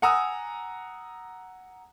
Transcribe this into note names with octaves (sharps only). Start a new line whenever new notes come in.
F#5 G#5 A#5 D#6 E6